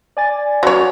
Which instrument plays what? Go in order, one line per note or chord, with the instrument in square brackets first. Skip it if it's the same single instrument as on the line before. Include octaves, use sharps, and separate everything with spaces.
[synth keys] D5 G#5 A6
[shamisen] F#3 C#5